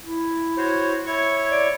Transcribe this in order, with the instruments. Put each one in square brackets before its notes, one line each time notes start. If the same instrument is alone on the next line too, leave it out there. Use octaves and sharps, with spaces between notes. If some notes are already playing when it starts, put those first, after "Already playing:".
[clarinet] E4
[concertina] F#4 C5 C#5
E4 C#5 C#6
[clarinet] D5